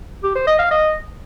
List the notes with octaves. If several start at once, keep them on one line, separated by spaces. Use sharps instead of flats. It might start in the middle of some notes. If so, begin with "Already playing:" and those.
G4
C5
D#5
F5
D#5